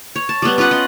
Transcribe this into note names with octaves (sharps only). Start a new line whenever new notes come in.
C#5
A5
G3 B3
C#4 F4 B4 F#5
D#5